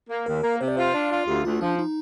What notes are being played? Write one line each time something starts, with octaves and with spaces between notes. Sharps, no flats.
A#3
D#2 A#4
A#3
C3 C5
D5
F4 C5
D4 D5
F4
D2 G4
D2 F4
F3 D4
D#4